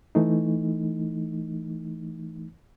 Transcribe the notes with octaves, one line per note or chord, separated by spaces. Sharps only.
E3 A3 D#4